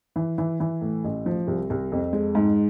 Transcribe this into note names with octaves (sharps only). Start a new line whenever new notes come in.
E3
E3
E3
A2
A1
F3
C2
C2
F2
G#3
G#2